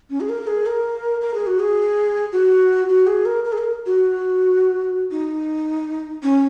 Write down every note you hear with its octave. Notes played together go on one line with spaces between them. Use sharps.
C#4
G#4
A#4
G#4
A#4
A#4
G#4
F#4
G#4
F#4
F#4
G#4
A#4
A#4
G#4
A#4
F#4
D#4
C#4